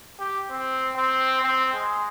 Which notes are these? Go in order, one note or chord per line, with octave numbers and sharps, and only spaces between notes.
G4
C4
C4
C4
G#3